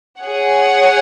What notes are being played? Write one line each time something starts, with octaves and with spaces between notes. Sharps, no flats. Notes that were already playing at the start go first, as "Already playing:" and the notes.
G#4 C#5 F#5